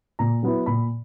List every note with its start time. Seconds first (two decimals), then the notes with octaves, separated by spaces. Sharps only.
0.19 A#2 A#5
0.43 F#3 B3 E4
0.66 A#2 B5